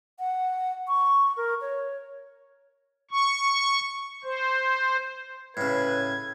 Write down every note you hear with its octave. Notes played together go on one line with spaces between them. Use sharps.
F#5
C#6
A#4
C#5
C#6
C5
A2 C#3 B4 G#6